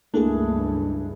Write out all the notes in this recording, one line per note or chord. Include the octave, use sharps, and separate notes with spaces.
C#2 G2 A3 A#3 D4 E4 G#4 A4